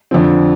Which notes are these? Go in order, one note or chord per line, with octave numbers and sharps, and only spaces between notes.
F2 D3 F3 C4